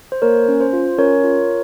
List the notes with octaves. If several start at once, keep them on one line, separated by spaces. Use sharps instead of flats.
C5
A#3 A#4 C#5
C#4
C5
F4
C#4 A#4 C#5
F4